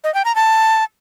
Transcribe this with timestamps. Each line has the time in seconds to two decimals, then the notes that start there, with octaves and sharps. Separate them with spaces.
0.04 D#5
0.14 G5
0.25 A#5
0.35 A5